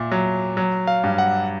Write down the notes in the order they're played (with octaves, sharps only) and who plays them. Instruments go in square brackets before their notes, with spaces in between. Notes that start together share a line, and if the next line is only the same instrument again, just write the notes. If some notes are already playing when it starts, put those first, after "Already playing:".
Already playing: [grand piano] A#2 [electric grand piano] E5
[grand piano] F#3
F#3
[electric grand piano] F5
[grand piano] G2
[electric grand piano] F#5